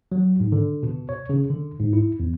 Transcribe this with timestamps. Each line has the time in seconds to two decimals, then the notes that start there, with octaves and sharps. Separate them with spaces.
0.12 F#3
0.40 G#2
0.52 D3
0.83 B2
1.09 C#5
1.29 C#3
1.50 D3
1.80 G#2
1.93 E4
2.20 E2